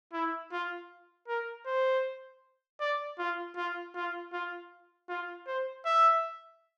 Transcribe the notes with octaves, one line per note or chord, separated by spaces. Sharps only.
E4
F4
A#4
C5
D5
F4
F4
F4
F4
F4
C5
E5